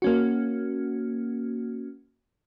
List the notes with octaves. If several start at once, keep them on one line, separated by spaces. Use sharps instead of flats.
A#3 C#4 F#4